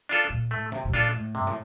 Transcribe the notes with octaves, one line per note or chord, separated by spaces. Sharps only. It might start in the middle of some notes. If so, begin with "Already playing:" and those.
D4 F4 A4
A#2
A2 A3
C3
C3
A#2 D4 F4 A4
A2
G2 C3
A2